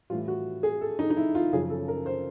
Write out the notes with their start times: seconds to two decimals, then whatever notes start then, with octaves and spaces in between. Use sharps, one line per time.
0.10 A2 E3 G3 F4
0.28 F#4
0.63 G#4
0.81 A4
0.99 D#4
1.10 D#4
1.17 E4
1.35 F4
1.53 F#2 C#3 F3 G#4
1.70 A4
1.88 A#4
2.06 C5